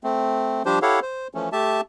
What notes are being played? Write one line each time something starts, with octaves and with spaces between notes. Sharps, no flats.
A3 C4
F3 G3 D4 G4 C5
E4 G4 A4 C#5 F5 F#5
C5
E3 F3 A3 C#4
A3 G4 E5 A5